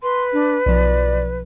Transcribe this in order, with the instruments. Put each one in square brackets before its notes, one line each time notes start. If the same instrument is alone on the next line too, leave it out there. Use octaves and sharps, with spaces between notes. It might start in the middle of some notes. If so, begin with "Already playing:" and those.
[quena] B4 [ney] C6
[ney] D4
[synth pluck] B1 F3 [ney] D5